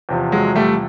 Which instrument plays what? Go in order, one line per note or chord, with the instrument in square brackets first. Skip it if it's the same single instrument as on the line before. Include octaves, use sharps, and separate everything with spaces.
[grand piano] E2 C3 F3
F#3 G#3
G3 A3